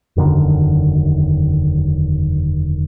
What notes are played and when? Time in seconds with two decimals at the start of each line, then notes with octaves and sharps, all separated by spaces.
0.16 E1 F#2 D3 D#3